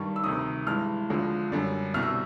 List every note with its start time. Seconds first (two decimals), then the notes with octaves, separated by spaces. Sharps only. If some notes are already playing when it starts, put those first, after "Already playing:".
Already playing: G2 D#3 G3 C#6
0.16 E6
0.24 D2 C3 D#3 D#6
0.67 G2 E3 G#3 F6
1.10 D2 D3 F3 G#3
1.52 F#2 D3 G3
1.94 C2 B2 G3 F6
2.03 E6